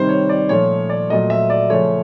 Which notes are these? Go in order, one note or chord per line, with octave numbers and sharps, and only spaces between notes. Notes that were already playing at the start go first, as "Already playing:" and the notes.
Already playing: C3 D#3 G3 C5
C#5
D5
A#2 F3 A3 C#5
D5
A#2 F#3 A3 D#5
E5
D5
C#3 F3 A3 C#5